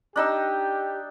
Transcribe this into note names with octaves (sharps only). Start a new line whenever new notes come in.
D4 D#4 G4 E6